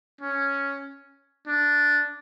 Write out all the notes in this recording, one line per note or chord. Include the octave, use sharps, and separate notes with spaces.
C#4
D4